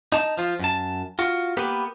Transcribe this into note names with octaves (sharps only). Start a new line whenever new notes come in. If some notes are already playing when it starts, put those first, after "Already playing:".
D#4 A5
F3 F4
F#2 A5
F4 F#4
A#3 B3 G4 B4